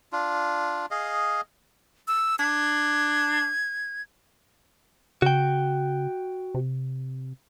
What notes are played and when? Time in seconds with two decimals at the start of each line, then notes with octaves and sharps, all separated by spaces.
0.13 D4 F4
0.91 G#4 D#5 F5
2.08 E6
2.39 D4 G#6
5.22 C#3 F#4 G5
6.54 C3